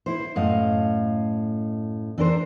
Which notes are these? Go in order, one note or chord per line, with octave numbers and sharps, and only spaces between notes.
E4 C5
F#2 A2 D#5 F5
E3 D4 A#4 C5